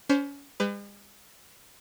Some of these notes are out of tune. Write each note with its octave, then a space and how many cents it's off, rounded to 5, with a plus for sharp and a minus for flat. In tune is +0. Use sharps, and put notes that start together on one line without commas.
C#4 +30 C5 +0
G#3 -45 B4 +35